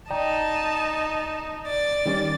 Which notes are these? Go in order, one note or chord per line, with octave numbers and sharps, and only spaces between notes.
D#4 D5 G5 A5 A#5
D5 A6
D#3 G3 C#4